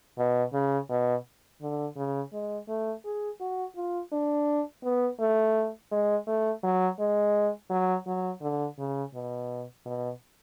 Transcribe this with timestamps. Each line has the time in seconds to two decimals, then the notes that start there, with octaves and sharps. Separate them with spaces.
0.18 B2
0.53 C#3
0.90 B2
1.61 D3
1.97 C#3
2.33 G#3
2.68 A3
3.05 G#4
3.41 F#4
3.76 F4
4.12 D4
4.84 B3
5.20 A3
5.91 G#3
6.27 A3
6.63 F#3
6.99 G#3
7.70 F#3
8.07 F#3
8.42 D3
8.79 C#3
9.14 B2
9.86 B2